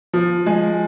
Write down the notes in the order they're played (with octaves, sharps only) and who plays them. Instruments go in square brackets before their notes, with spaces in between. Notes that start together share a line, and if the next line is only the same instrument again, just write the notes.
[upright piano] F3
G#3